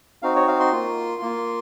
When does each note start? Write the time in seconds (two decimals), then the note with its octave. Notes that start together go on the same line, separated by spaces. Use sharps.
0.22 C4 D#4 F#4 F5
0.36 C#5
0.48 F5
0.60 C6
0.72 A#3 F4
1.22 A#3 F4